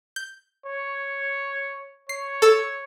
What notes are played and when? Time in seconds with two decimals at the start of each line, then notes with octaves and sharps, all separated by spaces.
0.16 G6
0.66 C#5
2.09 C#5 C7
2.42 A4 E6